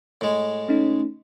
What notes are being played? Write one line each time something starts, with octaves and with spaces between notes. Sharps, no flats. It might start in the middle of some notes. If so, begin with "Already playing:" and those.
A2 G#3
A3 C#4 D#4